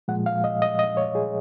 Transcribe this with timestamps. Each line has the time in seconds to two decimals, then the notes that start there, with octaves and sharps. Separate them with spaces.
0.08 A#2 F3 G#3 F#5
0.26 F5
0.44 D#5
0.62 D#5
0.79 D#5
0.97 C#5
1.15 G#4